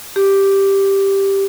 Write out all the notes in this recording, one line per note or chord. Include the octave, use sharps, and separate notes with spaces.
G4